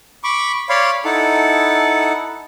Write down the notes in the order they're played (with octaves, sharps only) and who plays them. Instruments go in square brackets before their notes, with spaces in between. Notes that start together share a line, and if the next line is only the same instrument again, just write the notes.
[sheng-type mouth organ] B5 C#6 D6
C#5 D5 F5 B5 C6
D#4 E4 A4 F#5 A5